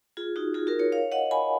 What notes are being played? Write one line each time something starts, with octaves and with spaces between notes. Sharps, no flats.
F4 G#4
D#4 F#4
F4 G#4
F#4 A#4
A#4 C#5
C#5 F5
D#5 F#5
G#5 B5